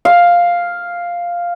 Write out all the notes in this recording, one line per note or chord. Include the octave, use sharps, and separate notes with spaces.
F5